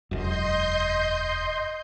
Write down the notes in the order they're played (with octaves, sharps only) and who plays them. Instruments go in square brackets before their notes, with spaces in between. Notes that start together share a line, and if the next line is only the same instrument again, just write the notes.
[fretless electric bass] E1 F#2 [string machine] D#5 C6 G6